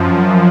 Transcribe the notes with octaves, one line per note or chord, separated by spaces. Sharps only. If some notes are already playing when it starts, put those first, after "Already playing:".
Already playing: F#2 F3